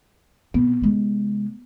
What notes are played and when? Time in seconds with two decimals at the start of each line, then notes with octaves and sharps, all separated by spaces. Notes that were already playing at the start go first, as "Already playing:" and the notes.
0.54 B2 B3 C4
0.82 C3 G#3